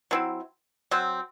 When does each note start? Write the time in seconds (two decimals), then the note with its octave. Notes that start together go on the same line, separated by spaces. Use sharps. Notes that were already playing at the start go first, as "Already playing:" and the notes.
0.11 F#3 C4 E4
0.91 F#3 C4